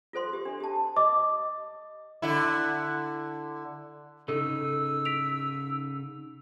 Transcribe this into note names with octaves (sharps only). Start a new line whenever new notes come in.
F4 A4 C5 C6
G4
D4
G4 A5
D#5 D6
D3 E4
C#3 D#4 A4 E6
B6 D7 F7